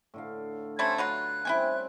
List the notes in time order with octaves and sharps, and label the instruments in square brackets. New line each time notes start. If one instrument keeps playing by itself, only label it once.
[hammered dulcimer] A2 D3 F5
[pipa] G3 A3 C4 [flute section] C#4 C6 G#6
[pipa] F#3 B3 F4 [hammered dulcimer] A#5 [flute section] F#6
[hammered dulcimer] G3 C4 C#4 [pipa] E4 G5 G#5